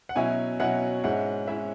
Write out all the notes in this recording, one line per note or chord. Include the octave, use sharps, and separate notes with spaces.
F#5
B2 F#3 C#4 E4 G#5
B2 F#3 C#4 E4 F#5
G#2 G#3 C#4 E4 F#5
G#3 C#4 E4 E5